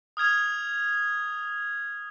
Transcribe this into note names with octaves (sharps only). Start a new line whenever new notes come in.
D#6 F6 G#6 F7